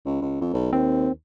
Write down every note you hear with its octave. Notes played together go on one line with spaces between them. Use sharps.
C#2
C#2
F2
B1
D#2 C4